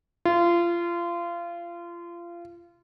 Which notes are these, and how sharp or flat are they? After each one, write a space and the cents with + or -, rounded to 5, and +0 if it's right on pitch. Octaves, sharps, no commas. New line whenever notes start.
F4 -25